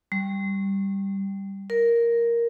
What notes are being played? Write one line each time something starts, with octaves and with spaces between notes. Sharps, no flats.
G3
A#4